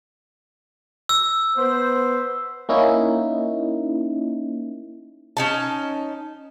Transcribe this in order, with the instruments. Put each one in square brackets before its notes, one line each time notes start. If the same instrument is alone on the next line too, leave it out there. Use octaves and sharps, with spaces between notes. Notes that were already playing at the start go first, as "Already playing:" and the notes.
[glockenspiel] E6
[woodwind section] B3 B4 C5
[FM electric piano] A#3 C#4 D#4 E4
[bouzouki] C#4 D#4 A5